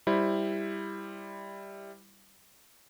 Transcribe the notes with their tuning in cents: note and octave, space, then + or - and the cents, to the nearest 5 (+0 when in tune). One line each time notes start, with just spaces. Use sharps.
G3 +10 E4 +0 C5 +0